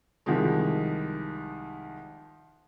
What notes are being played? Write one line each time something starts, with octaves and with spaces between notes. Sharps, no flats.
C2 D#3 F3 G#3